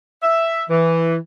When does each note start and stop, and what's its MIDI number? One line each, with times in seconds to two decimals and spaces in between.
0.23 0.64 76
0.70 1.16 52